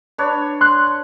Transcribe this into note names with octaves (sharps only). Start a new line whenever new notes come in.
D4 B4 C#5
C6 F#6